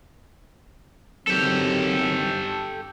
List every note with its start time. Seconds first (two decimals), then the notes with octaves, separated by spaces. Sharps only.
1.27 D#3 F#3 C4 G4 A4